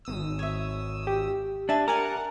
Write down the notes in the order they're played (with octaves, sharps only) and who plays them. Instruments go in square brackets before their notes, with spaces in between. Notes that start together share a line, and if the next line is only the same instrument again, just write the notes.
[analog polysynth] G#1 D#6 E6
[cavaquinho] C#5 E5
[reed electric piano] G4
[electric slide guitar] D4 [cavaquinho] E5 G#5 A5
[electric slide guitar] A#4 [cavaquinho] D5 G#5 D6 [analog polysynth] F#5